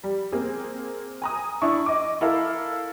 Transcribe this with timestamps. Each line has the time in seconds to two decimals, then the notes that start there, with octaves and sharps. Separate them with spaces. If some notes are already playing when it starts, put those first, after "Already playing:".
0.04 G3
0.32 A#3 C4 G#4
1.22 G#5 A#5 D#6
1.62 D4 E4 C#6
1.86 D#5 D6
2.21 E4 A4 A#4 F5